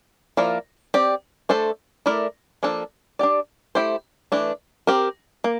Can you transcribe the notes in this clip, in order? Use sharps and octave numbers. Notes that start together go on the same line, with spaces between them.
F3 A#3 E4 A#4 D5
C4 G4 D5
A3 D4 A4 C5
A3 E4 A#4 D5
F3 A#3 D4 A4
D4 G4 D5
A3 E4 G4 C5
E3 A3 D4
C4 G4 A#4
A#3